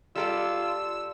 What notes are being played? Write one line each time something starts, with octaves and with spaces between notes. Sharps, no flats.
G3 F4 A4 D5 E6